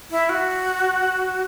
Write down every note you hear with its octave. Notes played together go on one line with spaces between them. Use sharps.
E4
F#4